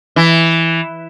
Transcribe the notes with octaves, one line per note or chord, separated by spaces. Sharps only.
E3